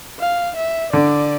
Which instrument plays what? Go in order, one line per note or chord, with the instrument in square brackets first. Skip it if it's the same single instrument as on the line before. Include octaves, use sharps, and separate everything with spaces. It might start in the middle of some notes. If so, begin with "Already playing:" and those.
[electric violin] F5
E5
[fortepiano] D3 [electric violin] D5